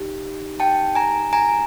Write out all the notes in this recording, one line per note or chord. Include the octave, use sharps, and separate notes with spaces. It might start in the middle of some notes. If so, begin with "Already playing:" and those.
Already playing: D#4 G4
G5 A5
G#5 A#5
G#5 A#5